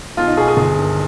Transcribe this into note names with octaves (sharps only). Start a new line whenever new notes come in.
B1 F4
D#4
B2 G#4
G#4
G1
G2 D#3